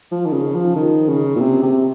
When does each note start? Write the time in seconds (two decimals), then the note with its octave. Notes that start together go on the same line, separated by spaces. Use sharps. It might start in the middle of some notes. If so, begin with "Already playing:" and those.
0.12 F3
0.26 D#3
0.33 C#3
0.55 F3
0.76 D#3
1.09 C#3
1.36 A#2
1.41 C3
1.63 C3